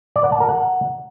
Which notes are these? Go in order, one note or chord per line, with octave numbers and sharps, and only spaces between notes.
D5
F#5
A5
A#4
F#5